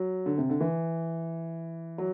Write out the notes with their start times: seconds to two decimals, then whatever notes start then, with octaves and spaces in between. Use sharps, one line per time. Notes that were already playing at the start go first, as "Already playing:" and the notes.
Already playing: F#3
0.26 D3
0.38 C3
0.49 D3
0.61 E3
1.98 F#3